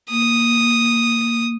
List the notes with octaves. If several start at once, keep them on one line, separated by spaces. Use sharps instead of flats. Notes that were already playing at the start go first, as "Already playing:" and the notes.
A#3 D#6